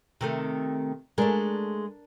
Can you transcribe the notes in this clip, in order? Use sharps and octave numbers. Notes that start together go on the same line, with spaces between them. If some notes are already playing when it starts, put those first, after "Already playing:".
C3 D#3 A3
G#3 A3 D4 A#4